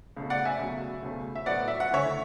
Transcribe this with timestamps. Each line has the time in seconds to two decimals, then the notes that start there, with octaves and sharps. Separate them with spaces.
0.16 C#2 B2 A3
0.30 D5 F#5
0.45 E5 G#5
0.59 C#2 B2 F#3 A3
1.03 C#2 B2 A3
1.35 E5
1.46 A2 F#3 B3 D5 F#5
1.68 E5
1.80 F#5
1.90 D2 C#3 E3 A3 C#5 E5